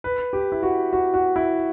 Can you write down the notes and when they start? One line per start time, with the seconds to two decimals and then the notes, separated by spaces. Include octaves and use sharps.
0.04 B4
0.33 G4
0.52 E4
0.63 F#4
0.93 F#4
1.14 F#4
1.36 E4